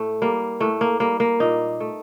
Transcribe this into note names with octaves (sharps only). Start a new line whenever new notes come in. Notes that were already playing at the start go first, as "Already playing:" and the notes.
Already playing: A2 A3
G3 A#3
A2 A3
A#3
G3 A#3
A#3
A#2 D#4
A3